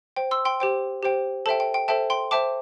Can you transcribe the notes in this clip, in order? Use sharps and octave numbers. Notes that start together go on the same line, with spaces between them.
C5 G5
C6 E6
G5 C6
G4 C5 G5
G4 C5 G5
A4 C5 E5 G5 A5
G5
G5
A4 C5 E5 G5 A5
G5 C6
C5 E5 G5 A5 D6